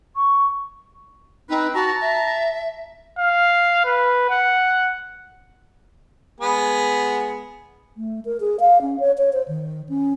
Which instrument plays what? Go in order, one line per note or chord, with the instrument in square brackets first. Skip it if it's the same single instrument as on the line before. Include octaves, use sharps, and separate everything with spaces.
[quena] C#6
[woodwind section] C4 B4 [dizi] D#4
[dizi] F#4 [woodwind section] A5 A#5
[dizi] E5
[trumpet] F5
B4
F#5
[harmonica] G#3 B3 G#4
[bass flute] A3
A#4
G#4
F5
C#4
C#5
C#5
C5
D#3
C#4